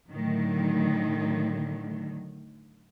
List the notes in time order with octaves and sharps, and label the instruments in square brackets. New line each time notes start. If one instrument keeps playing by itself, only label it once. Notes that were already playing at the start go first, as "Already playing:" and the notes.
[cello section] A2 D3 D#3 F#3